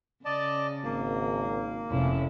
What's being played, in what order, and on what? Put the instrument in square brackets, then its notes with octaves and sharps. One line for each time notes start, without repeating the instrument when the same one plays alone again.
[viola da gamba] C#3 [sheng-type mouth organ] D5 D#5 A5
[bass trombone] G#1 [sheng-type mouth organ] A#3
[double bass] F1 [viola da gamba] C#4 E4